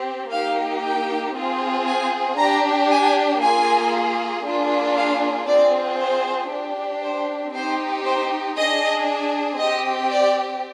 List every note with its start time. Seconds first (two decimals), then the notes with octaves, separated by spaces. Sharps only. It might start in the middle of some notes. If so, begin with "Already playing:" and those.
Already playing: C4 G4
0.32 A#3 D#4 G4 F5
0.83 G5
1.35 C4 F4 G#4
1.87 G#5
2.38 D4 G4 A#5
2.90 G#5
3.41 A#3 F4 G#4 G#5
4.44 A#3 D4 F4 G#4
4.96 F5
5.48 C4 F4 G#4 D5
5.99 C5
6.51 D4 G4
7.02 C5
7.54 C4 D#4 G4 C5
8.05 C5
8.56 D4 G#4 D#5
9.59 C4 G4 D#5
10.11 D5